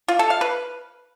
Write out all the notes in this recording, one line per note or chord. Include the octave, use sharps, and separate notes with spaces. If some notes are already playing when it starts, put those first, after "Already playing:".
F4
A4
F5
B4